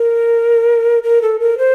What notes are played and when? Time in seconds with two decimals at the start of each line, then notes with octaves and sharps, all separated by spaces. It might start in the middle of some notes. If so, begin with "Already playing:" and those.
Already playing: A#4
1.03 A#4
1.22 A4
1.40 A#4
1.58 C5